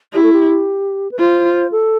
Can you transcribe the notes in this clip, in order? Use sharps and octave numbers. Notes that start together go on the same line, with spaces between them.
E4 G4
A4
G4
B4
F4 C5
A4